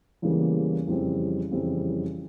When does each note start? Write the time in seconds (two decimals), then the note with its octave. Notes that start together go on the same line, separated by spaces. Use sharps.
0.22 E2 C#3 E3 G3 A#3
0.87 F2 C#3 E3 G3 C4
1.51 F2 C#3 E3 G3 C4